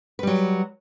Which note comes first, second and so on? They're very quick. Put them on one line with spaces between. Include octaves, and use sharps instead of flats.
B4 G3 F#3